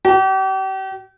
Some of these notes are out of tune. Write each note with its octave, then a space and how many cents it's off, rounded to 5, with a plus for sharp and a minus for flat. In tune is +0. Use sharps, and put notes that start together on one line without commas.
G4 -40